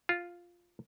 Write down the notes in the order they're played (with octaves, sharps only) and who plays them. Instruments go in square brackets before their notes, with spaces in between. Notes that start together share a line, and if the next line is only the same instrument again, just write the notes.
[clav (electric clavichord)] F4